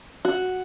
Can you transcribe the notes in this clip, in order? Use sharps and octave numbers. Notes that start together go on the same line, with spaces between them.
F#4